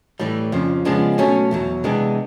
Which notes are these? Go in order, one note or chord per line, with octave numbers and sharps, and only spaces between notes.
A2 E3 G3
F2 C#3 F3
C#3 F3 G#3 B3 D4
B2 F#3 A3 C#4
E2 B2 F#3
C3 E3 G#3 B3 D4